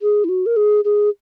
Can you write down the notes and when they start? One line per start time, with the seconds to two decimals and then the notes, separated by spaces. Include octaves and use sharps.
0.02 G#4
0.24 E4
0.29 F#4
0.46 A#4
0.56 G#4
0.84 G#4